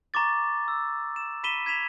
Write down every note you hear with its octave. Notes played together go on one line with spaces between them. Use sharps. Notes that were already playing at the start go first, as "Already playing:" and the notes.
A#5 C#6 D6 A6
E6
E7
B5 B6 D#7 E7 G7
G#6 B6 E7 F7